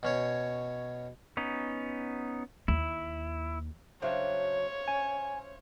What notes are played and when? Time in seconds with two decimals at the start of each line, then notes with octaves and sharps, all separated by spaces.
0.03 B2 C#4 C#5
1.37 B3 C#4 D#4
2.68 D#2 E4
4.02 C#3 F#3 D4 C5 C#5 E5 F5
4.88 C#4 G#5